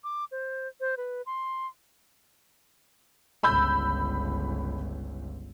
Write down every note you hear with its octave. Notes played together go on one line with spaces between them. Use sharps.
D6
C5
C5
B4
C6
G1 C#2 B5 E6 G6